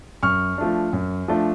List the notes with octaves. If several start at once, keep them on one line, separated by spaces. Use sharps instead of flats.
F#2 C#6 F6
F3 A3 D4
F#2
F3 A3 D4